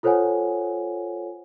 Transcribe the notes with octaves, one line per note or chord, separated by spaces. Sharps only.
F4 A4 C5 C#5 F#5 G#5